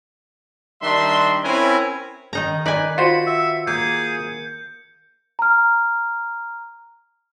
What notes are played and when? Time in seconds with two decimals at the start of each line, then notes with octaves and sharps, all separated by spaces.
0.82 D#3 G3 D4 E5 C6
1.44 C4 C#4 E4 A#4 B4 G#5
2.33 D#3 D#4 A#5
2.66 D#4 B4 D5 G#5
2.98 F4 F#4 C5 B5 C#7
3.27 E5
3.67 A#3 G#4 G6
5.39 A#5 F6